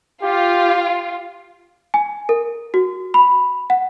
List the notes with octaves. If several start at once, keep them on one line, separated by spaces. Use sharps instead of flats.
F4 G4
G#5
A#4
F#4
B5
F#5